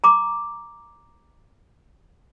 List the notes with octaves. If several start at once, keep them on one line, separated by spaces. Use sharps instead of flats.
A#5 D6